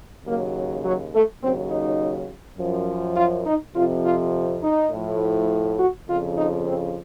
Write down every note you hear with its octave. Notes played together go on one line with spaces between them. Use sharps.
D#2 C#3 F#3 A#3
F#3
A3
D#2 C#3 F#3 C4
D#4
F#2 F3
F4
D#4
F2 C3 F3 F4
F4
D#4
A2 F3
F#4
F2 C#3 F3 F4
D#4
C4